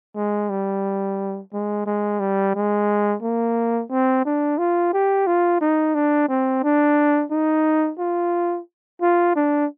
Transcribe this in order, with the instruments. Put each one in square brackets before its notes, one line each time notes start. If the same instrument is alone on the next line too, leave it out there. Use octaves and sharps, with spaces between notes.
[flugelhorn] G#3
G3
G#3
G#3
G3
G#3
A#3
C4
D4
F4
G4
F4
D#4
D4
C4
D4
D#4
F4
F4
D4